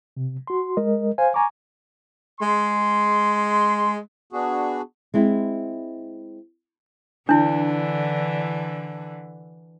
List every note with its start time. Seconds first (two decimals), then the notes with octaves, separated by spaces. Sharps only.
0.17 C3
0.47 F#4 C6
0.77 G#3 A#4 D#5
1.18 C5 F5 G#5
1.34 G#5 A#5 C#6 D6
2.41 G#3 C6
4.33 B3 D4 F#4 G#4
5.14 G#3 C4 E4
7.29 D3 E3 D4 E4